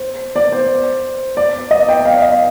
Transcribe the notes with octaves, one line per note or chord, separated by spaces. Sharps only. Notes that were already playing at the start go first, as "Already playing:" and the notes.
Already playing: C5
D5
C5
D5
D#5
G5
F5
D5
D#5
F5